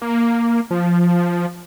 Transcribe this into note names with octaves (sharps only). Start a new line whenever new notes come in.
A#3
F3